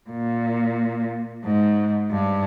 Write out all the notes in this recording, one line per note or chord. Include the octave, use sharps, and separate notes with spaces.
A#2
G#2
G2